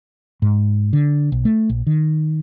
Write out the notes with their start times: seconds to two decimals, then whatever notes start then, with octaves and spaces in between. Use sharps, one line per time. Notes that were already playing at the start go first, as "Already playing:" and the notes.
0.42 G#2
0.93 D3
1.32 B1
1.45 A3
1.70 A#1
1.87 D#3